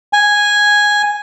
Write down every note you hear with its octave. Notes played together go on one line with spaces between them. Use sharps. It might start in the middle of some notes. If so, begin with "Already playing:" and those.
G#5